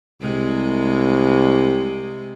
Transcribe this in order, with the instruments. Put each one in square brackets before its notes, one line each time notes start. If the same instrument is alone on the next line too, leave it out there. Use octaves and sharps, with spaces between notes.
[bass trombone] C2 [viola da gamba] C3 G#3